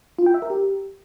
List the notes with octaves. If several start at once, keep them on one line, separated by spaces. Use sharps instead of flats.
F4
G5
E5
A#4
G4